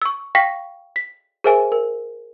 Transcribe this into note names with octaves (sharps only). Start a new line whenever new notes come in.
C#6 E6
F5 G5 C#6 A#6 B6
B6
G#4 A#4 C5 E5 G#5
A#4